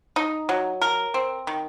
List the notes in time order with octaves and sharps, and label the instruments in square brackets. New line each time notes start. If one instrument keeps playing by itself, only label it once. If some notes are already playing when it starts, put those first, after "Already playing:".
[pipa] D#4
F#3
A#4
C4
D#3